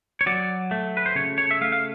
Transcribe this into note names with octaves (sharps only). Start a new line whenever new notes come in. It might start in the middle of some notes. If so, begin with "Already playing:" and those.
C#5
F#3 D5
A3
B4
C5
C#3 C#5
C#5
E5
A3 F5
F5